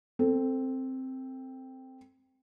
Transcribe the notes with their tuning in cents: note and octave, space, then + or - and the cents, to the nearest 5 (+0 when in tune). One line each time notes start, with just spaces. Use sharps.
C4 +0 A4 +15